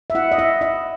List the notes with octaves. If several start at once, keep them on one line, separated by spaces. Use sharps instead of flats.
E5
E4 F#5
D#5
E4 E5
E4 D#5